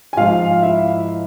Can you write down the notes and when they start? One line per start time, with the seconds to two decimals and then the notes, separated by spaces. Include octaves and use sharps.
0.13 G#5
0.17 G#2 F3 F4 F5
0.62 E4 E5